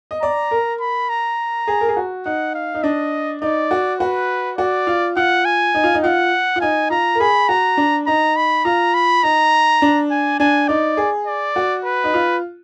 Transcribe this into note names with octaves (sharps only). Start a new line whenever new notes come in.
D#5
D5 A#5
A#4
B5
A#5
G#4
A#4
G#4
F#4
D#4 F#5
F5
D#4
D4 D#5
D#4 D5
F#4
F#4 B4
F#4 D5
F4
F4 F#5
G#5
D#4
F4
D#4
F4 F#5
F4
D#4 G#5
F4 A#5
A#4
G#4 B5
F#4 A#5
D4
D#4 A#5
B5
F4 A#5
B5
D#4 A#5
D4
G#5
D4 G#5
D#4 D5
G#4
D5
F#4
B4
D#4
F4